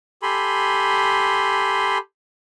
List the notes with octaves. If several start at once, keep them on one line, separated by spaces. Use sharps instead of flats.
G4 A4 G#5 B5 C6